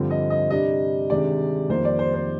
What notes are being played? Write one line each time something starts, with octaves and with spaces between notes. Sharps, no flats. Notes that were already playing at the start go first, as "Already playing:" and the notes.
Already playing: G2 D3 F3 C4
D#5
D#5
C3 G3 D4 D#5
C3 D#3 G#3 D4 D5
F2 D#3 G3 A#3 C5
D5
C5
C5